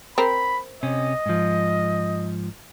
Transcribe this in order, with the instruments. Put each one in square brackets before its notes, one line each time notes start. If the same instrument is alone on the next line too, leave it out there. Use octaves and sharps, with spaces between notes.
[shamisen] C4 A#4 [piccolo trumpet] B5
[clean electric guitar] C3 C#4 [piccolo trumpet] D#5
[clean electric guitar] G#2 F3